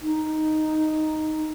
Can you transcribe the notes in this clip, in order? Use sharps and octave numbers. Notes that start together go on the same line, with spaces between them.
D#4